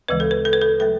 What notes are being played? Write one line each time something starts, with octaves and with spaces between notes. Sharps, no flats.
D2 C#3 E3 G#3 B4
A4
B4
A4
B4
A4
F#3 A3 A4